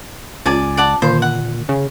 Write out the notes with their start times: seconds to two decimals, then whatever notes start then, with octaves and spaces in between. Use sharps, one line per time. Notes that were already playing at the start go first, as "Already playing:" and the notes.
0.46 C#2 C#4 F4 D5 G#5
0.77 D5 F#5 A5
1.02 A#2 D3 D#3 C5
1.22 F#5
1.69 C#3